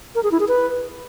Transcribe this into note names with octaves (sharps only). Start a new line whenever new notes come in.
A#4
G#4
E4
G#4
B4